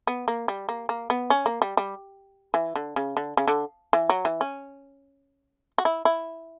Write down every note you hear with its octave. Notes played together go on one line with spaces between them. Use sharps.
B3
A#3
G3
A#3
A#3
B3
C#4
A#3
G3
G3
E3
D3
C#3
D3
C#3
D3
E3
F#3
E3
C#4
F#4
E4
E4